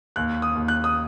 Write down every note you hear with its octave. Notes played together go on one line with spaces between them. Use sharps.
D#2 F#6
D#6
D#2
F#6
D#6